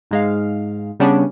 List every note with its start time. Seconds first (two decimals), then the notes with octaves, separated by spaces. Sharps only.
0.11 G#2 G#3 F5
1.00 C#3 G3 B3 C#4 D4